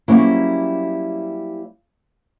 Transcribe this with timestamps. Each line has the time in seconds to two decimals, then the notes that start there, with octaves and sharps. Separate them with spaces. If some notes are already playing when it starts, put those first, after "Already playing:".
0.08 F#3 G3 A#3 C4 C#4 E4